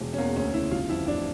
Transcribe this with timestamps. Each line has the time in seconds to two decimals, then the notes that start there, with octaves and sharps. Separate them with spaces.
0.01 E1
0.13 C#4
0.18 E2 A#3
0.36 D2 C#4
0.54 C#3 E4
0.71 G1 F4
0.89 F2 E4
1.07 A1 D4